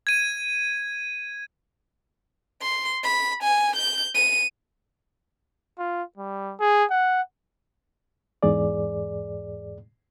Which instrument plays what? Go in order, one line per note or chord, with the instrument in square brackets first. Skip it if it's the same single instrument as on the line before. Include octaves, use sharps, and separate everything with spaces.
[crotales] G#6 D#7
[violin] C6
B5
G#5
G6
D#7
[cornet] F4
G3
G#4
F#5
[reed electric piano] E2 G#2 G#4 D5